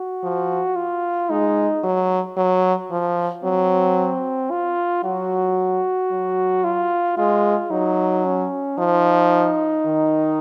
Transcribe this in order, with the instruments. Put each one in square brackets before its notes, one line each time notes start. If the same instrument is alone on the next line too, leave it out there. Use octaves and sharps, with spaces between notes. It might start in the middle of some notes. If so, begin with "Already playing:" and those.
Already playing: [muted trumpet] F#4
[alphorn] F3
[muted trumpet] F4
[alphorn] G#3 [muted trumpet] D#4
[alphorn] F#3
F#3
F3
[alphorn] F#3 [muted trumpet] C4
[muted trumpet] F4
[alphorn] F#3 [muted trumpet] F#4
[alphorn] F#3
[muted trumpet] F4
[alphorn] G#3 [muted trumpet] F4
[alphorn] F#3 [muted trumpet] D#4
[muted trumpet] C#4
[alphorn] F3 [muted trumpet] D#4
[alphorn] D#3